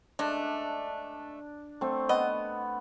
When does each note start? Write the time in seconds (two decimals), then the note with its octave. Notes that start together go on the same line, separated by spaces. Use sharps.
0.19 G#3 A3 D4
1.81 A3 C4
2.09 B3 D#5